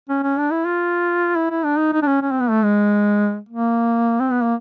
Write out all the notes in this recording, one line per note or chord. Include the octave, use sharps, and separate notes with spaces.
C#4
C#4
D4
E4
F4
E4
E4
D4
D#4
D#4
D4
C#4
C#4
C4
B3
A3
G#3
A#3
C4
B3
A#3